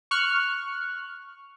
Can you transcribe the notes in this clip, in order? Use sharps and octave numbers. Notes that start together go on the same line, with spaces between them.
C#6 F6 F#6